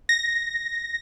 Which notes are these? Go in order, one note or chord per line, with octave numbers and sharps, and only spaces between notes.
A#6